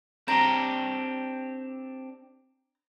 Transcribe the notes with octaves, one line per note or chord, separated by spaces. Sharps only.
C4 D4 G4 A#5